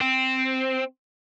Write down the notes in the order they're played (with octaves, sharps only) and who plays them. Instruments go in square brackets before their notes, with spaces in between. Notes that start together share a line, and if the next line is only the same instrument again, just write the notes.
[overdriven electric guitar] C4